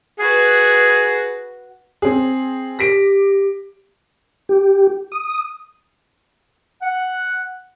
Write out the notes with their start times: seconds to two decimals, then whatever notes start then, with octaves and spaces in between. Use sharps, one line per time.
0.19 F#4 G#4 B4
2.02 C4 G#4
2.79 G4 A#6 B6 D7
4.49 G4
5.12 D#6
6.83 F#5